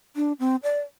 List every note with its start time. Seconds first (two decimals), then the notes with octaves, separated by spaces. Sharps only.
0.16 D4
0.40 C4
0.63 D5